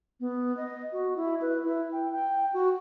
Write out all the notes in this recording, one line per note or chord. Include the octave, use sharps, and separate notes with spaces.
B3
D#5
F#4
E4
B4
E4
G5
G5
F#4